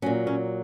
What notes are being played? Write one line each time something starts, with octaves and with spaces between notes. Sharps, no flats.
A#2 F#3 C#4
C#4